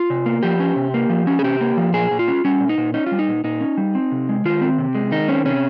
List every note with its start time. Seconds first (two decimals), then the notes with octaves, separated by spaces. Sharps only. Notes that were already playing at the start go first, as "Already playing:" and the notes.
Already playing: F4
0.10 C3
0.26 A#3
0.43 F3 G4
0.60 C#4
0.76 C3
0.94 A#3
1.10 F3
1.27 C#4
1.39 G#4
1.43 C3 G4
1.61 A#3
1.77 F3
1.93 A#2 G#4
2.11 A#2
2.19 F4
2.28 C#4
2.45 G3 C#4
2.60 A#2
2.69 D#4
2.78 A#2
2.94 C#4 D#4
3.06 F4
3.12 G3
3.19 D#4
3.28 A#2
3.44 A#2 D#4
3.61 C#4
3.77 G3
3.95 C4
4.12 C3
4.29 G#3
4.45 D#3 F4
4.61 C4
4.78 C3
4.95 G#3
5.11 D#3 D#4
5.28 C4 C#4
5.45 C3 C#4